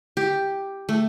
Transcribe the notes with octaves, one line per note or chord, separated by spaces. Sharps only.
G4
A3